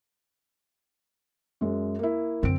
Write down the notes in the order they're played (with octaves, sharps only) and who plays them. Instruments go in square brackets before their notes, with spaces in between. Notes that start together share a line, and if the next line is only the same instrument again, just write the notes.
[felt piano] F#2 G#3
A#3 E4
[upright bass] F#2 D3 [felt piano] C4 D7